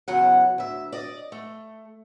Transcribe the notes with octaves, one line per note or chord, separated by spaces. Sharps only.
E2 C#3 F#3 F#5
D2 E5
D5 D#5
A3